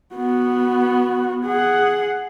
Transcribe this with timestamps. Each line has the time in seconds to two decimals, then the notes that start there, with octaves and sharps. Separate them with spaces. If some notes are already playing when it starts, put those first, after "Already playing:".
0.15 B3 F#4
1.44 G#4 F#5